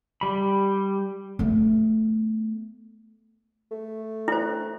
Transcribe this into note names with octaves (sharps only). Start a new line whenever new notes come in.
G3 B5
A3 B3
A3
E4 C5